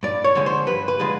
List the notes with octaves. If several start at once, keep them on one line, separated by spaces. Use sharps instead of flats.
G2 D5
C#5
D3 F3 G#3
C5
G2 B4
B4
D3 F3 G#3